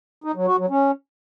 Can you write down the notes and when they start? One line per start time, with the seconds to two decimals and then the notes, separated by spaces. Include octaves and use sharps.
0.24 D#4
0.35 F#3
0.47 F#4
0.58 F#3
0.70 C#4